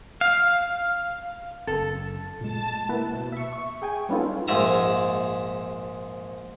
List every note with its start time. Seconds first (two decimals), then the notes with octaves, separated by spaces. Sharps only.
0.21 F5
1.67 F#1 A4
2.41 A#2 G#3 A5
2.89 C3 A#3 B3 E4 B4
3.14 B2
3.32 E5 C#6
3.53 C#6
3.82 G#4 G5 G#5
4.09 G3 B3 C#4 D#4 F4 A4
4.48 A#1 G#2 E5 A#5